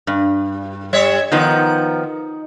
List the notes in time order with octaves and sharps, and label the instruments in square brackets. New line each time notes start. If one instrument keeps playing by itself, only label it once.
[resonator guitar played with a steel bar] G2
[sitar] G3 C#5 E5
[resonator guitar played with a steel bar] D#3 F3 B3 [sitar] D#4